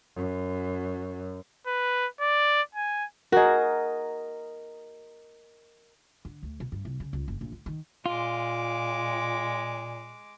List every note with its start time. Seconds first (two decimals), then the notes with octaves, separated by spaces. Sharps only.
0.16 F#2
1.66 B4
2.20 D5
2.75 G#5
3.32 F#4 G#4 A#4 D#5
6.25 D3
6.43 D2
6.60 B2
6.72 G2
6.85 C2
7.00 C#3
7.13 C#2
7.28 F#1
7.41 A#1
7.52 D3
7.66 D#3
8.06 A#2 G#3 F4 D6